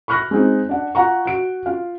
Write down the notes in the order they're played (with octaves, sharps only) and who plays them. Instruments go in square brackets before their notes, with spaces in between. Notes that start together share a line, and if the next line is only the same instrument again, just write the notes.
[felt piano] B5 C#6 F6 F#6 A#6
G#3 C4 D#4
D4 F#5
F4 F#5 A#5 C#6
F#4 D7
F4 F5